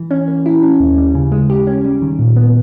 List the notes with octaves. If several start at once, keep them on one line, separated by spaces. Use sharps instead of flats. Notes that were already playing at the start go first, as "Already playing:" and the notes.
Already playing: E3
C#4
A#3
E4
C#4
D#2
G3
C#3
G#3
G4
C#4
G3
D#3
A#2
B3